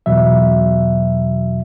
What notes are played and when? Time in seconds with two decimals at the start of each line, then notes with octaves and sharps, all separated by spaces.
0.06 E2 B2 F#3 E5